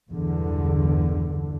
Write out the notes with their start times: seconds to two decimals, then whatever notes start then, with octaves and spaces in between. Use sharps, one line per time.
0.10 B1 E2 G2 D3